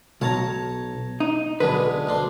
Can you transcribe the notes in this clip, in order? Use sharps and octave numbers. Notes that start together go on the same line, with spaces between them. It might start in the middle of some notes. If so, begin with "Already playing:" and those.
B1 C#5 A5 A#5
D#4
B1 D3 G#3 B4
D2 D4 C6